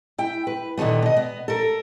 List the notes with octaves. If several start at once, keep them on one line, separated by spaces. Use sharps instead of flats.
E4 G5
B4
A#2 D3 D#3 A3 B3
B2 D#5
B3
A4 A#4